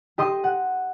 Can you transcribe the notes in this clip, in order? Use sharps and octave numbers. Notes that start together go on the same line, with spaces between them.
G4 D#5 C6 D#6
F#5